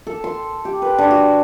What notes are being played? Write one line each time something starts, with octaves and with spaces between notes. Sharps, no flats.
A4
C6
G4
B4
D3
F#4